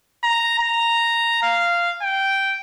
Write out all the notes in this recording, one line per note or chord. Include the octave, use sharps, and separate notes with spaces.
A#5
A#5
F5
G5